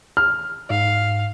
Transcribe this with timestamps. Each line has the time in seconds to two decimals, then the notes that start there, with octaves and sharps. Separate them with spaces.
0.17 F6
0.70 G#2 F5